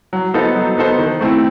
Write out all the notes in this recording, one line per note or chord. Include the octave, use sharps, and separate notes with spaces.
F#3
B3 D#4 A4 C5
F#3
B3 D#4 A4 C5
D#3
A3 C4 E4